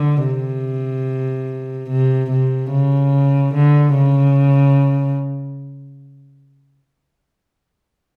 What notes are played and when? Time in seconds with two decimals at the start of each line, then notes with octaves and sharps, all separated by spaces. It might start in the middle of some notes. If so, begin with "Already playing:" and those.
Already playing: D3
0.25 C3
1.90 C3
2.30 C3
2.71 C#3
3.54 D3
3.95 C#3